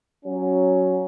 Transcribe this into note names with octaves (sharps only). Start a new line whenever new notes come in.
F#3 C#4